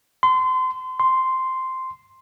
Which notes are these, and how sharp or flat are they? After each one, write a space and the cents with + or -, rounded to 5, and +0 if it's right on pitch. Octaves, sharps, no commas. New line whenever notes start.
C6 -30
C6 -5